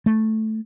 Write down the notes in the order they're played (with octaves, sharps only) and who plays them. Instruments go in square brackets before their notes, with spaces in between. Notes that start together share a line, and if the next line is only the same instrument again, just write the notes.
[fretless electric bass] A3